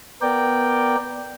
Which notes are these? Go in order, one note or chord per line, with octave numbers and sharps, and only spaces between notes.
B3 A#4 D5 G5